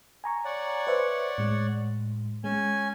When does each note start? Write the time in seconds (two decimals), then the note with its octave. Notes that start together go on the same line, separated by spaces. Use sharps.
0.24 G#5 A#5 C#6
0.45 C#5 D5 F#5
0.87 B4 C5 E5
1.38 A2 G#3
2.44 G#3 C#4 G#5